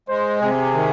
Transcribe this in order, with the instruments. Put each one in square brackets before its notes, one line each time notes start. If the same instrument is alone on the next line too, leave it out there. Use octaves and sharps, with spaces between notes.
[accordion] G#3 [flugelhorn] C5
[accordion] C3 [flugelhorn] G#4
[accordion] D#3